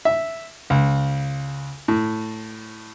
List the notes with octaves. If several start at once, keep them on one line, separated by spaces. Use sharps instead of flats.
E5
C#2
A2